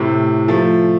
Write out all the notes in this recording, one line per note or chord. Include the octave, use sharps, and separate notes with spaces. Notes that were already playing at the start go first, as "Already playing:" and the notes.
Already playing: A2 C3
F3 A3